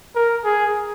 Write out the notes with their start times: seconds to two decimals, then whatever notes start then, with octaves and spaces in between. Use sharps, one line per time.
0.15 A#4
0.44 G#4